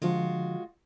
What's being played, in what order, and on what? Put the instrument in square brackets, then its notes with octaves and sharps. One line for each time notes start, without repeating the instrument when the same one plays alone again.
[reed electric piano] D3 F3 [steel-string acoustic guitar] G#3 F4 F#4